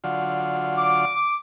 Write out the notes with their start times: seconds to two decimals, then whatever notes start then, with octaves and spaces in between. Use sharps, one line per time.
0.04 D3 F#3 F4
0.78 D6